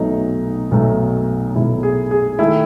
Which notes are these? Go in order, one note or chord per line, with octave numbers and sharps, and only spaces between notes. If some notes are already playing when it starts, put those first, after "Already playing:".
Already playing: B1 B2 F#3 A3 D#4
B1 B2 F#3 A3
B1 B2 F#3 A3 E4
G#4
G#4
D#3 A3 E4